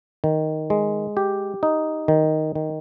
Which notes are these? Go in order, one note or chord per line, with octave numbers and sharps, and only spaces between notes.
D#3
G#3
G4
D#4
D#3
D#3